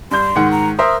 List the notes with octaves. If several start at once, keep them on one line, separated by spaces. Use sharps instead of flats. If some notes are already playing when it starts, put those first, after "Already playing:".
G2 C6 G6
G#2 D#3 F#5
A#5
A#4 C5 E5 D#6